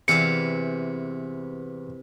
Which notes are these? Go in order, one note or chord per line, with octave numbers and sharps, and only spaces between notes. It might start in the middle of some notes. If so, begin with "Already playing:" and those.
E2 C3 E3 D5 F5 C#7